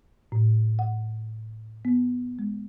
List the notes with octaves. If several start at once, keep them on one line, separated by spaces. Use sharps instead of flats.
A2
F#5
B3
G#3